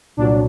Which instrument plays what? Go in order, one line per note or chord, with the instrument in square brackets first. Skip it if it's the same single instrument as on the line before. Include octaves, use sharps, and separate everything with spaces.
[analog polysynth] C2 A#2 F#3 D4